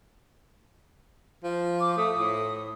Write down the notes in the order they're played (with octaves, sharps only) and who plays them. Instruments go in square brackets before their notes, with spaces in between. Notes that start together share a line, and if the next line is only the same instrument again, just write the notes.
[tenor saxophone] F3
[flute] D6
[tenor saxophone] A3 [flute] D#6
[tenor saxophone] A2